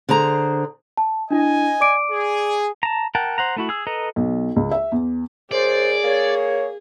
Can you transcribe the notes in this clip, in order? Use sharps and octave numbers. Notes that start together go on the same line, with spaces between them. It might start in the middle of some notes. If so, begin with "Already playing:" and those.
D3 G#4 C5 A#5
A5
D4 E4 D#5 G#5
D5 D6 D7
G#4
A5 A#5
A#4 F#5 G5 A5
C5 F#5 A#5
A3 E4 F#4
G#4 E6
A4 B4 D#5 A#5
B1
C#2
E5
E2
F#2 G#4 C5 D5
A#3 C#5